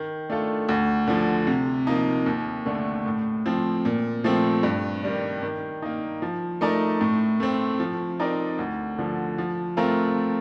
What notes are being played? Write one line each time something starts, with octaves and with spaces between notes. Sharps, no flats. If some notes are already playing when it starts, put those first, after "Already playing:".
Already playing: D#3
A3 D4 F4 A4
D2
D3 F3
C3
F3 A#3 D#4
D#2
D3 A3 D4
A2
F3 C4
A#2
F3 A3 C4
G2
D#3 G3 D4
D#3
A#3 D#4
F3
A3 D#4 A#4 D5
A2
A3 C4
F3
C4 D#4 A#4 D5
D2
D3 F3
F3
A3 C4 F4 A#4